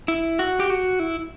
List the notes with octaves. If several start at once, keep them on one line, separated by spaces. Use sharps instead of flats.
E4
F#4
G4
F#4
E4